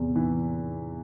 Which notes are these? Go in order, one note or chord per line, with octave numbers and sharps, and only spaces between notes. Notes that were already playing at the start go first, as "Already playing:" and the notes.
Already playing: E2 C3 E3
E3